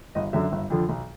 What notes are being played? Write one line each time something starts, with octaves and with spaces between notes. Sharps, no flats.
G1 D#5
F#2 D3 F#3 E5
G1
F2 D3 F3
B1